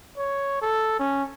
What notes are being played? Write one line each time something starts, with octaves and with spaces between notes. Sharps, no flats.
C#5
A4
C#4